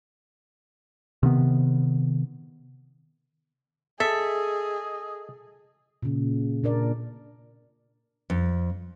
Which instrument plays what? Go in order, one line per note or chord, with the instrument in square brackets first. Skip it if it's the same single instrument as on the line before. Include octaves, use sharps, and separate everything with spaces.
[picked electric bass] C3 D#3 B3
[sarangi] G#4 [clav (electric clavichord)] A4 [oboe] D#5 [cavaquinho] E5
[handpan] A#2 C#3
A#2 D4 A#4 D5
[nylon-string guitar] F2